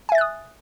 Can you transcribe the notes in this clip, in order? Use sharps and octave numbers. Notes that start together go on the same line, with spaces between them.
E5 G#5 D#6 F#6 A6